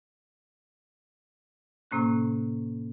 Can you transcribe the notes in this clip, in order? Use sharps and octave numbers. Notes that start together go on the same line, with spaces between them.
A2 C3 A#3 C#4 F#6